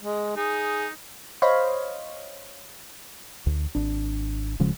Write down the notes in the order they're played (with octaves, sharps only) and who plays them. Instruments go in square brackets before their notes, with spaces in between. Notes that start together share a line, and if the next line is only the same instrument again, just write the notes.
[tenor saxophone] G#3
[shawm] D#4 [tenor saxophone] G#4
[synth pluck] C5 C#5 D#5 F5 B5
[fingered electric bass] D2
G#1 D4
D1 C#3 F3 G#3